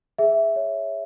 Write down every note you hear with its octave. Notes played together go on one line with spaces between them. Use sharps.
G#4 E5
C#5